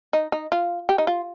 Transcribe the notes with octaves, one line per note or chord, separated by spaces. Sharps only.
D#4
D#4
F4
G4
D#4
F4